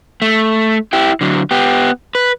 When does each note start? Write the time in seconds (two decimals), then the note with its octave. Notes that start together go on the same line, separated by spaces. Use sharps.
0.22 A3
0.93 E4 G4
1.21 D3 F#3
1.51 B3 G4
2.15 B4